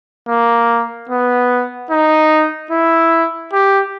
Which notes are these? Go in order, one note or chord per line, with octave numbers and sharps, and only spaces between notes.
A#3
B3
D#4
E4
G4